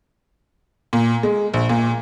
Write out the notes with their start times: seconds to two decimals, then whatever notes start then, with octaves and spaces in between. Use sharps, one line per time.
0.93 A#2
1.23 G#3
1.54 A#1
1.69 A#2